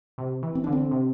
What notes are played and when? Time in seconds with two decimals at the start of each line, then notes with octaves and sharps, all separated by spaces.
0.18 C3
0.43 E3
0.55 C4
0.64 D3 D4
0.72 C4
0.91 C3